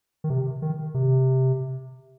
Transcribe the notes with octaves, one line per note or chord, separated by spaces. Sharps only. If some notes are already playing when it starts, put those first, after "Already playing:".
D#3
C3
D#3
C3